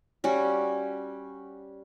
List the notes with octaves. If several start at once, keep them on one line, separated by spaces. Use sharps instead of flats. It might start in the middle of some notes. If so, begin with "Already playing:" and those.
G3 C#4 F#4